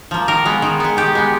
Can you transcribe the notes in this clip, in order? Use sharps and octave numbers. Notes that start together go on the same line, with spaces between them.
F3 A#3
D#3 A#4
G#3 B3
D#3
G#3 B3
D#3 G4
G#3 B3